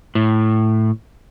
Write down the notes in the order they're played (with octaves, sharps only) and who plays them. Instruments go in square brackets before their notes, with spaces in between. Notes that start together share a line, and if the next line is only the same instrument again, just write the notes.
[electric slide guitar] A2